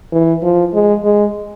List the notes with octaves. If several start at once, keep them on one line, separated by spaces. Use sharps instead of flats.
E3
F3
G#3
G#3